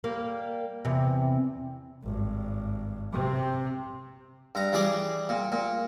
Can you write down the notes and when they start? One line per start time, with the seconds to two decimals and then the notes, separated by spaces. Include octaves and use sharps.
0.04 G3 A#3
0.85 E2 C3
2.04 G#1 G2
3.12 C3 C4
4.55 G2 A#5
4.73 E3 G3 G#4 D5
5.29 A#2
5.52 A#2